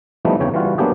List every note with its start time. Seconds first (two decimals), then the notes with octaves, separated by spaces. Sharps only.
0.25 E3 F3 G3 A3 B3 D#4
0.40 E2 C#3 E3 C#5 G5
0.54 E3 G3 F4 F#4
0.78 F#3 A#3 B3 D4 G4 G#4